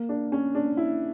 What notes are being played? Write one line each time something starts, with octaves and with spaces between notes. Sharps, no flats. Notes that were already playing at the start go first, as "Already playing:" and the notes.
Already playing: A#3
D4
C#4
D4
E4